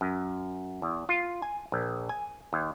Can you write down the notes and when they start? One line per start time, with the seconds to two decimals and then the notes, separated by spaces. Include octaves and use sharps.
0.01 F#2
0.82 E2
1.09 F4
1.42 G#5
1.72 A#1
2.09 G#5
2.53 D#2